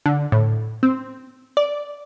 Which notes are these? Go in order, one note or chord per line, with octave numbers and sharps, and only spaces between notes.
D3
A2
C4
D5